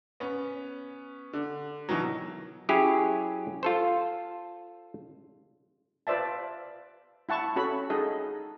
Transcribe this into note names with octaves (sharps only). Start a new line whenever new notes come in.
B3 C#4
D3
B2 D#3 E3 F#3
F#3 C#4 E4 G4 G#4
F4 A4 C5
F4 B4 C5 D5 E5 A5
E4 F#5 A5 C#6
C#4 F#4 A4 B5
D#4 G#4 A4 D#5